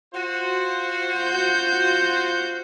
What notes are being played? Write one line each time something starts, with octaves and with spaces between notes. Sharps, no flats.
F4 F#4 C5
G6